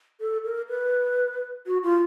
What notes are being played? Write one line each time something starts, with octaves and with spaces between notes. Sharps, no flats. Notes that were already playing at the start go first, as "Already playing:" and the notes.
A4
A#4
B4
F#4
F4